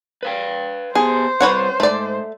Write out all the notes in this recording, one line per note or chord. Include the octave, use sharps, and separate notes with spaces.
B4 F5 G5
B3 G4 G#4 C5
G3 C4 B4 C#5 F#5
G#2 A3 D5